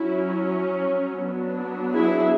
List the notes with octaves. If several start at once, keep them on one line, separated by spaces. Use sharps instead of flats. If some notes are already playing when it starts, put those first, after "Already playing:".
Already playing: F#3 C#4 E4
F#3 B3 D4
E4 G#4